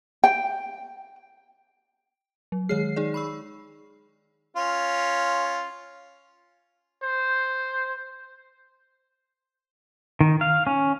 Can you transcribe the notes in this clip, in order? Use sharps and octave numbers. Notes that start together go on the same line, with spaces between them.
G5
F#3
D#3 G#3 C#5 F6 C7
D#4 G#4 D5
B5 C#6 E6
C#4 F4
C5
D#3
F5
C#4